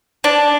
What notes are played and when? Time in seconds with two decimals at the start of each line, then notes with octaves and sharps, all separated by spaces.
0.24 D4